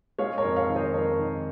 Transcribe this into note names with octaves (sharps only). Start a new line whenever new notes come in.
G#3 C#5 F5
A#4 C#5
F2
C#5 F5
D#3
C5 D#5
F2 A#4 C#5
D#3